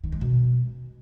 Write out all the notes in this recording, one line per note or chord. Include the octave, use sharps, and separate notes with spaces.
D#3
G#3
B2